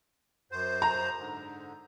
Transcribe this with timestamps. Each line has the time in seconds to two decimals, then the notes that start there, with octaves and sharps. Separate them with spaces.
0.52 F#2 C5
0.82 A#5
1.18 G#2 D3